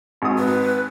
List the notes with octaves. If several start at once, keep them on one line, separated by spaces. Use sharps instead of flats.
G#1 F#4 D#6
B4